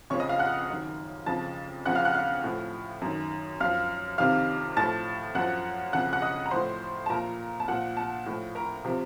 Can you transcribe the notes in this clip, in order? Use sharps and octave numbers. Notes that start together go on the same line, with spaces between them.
F2 C#3 F3 C#5 C#6
D#5 D#6
F5 F6
F#5 F#6
F#2 D#3
F2 C#3 F3 A5 A6
F2 C#3 F3 F#5 F#6
F5 F6
F#5 F#6
F5 F6
A2 F3
F#2 D#3
F#2 F3 F5 F6
F2 C3 D#3 F5 F6
A2 F3 A5 A6
F#2 F3 F#5 F#6
F2 C#3 F3 F#5 F#6
F#5 F#6
D#5 D#6
A#5
A2 F3 C5 C6
A5
A#2 F3 A#4 A#5
A5
A#2 F3 F#5
A5
A2 F3
A#4 A#5
C3 F3